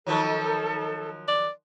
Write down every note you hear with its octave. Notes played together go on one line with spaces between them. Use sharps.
D#3 F3 F#3 A4
D5